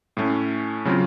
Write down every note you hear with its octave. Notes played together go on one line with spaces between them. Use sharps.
A2 A3 C#4
C#3 F#3 C4 F4